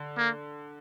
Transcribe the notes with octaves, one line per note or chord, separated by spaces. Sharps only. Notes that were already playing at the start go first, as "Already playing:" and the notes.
Already playing: D3
A#3